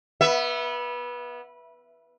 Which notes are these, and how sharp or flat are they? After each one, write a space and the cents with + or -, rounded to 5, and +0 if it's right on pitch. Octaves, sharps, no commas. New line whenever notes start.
B3 -20 E5 +10